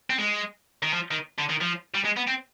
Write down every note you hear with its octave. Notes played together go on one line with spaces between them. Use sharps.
C4
G#3
D#3
F3
D#3
D3
D#3
F3
G3
G#3
B3
C4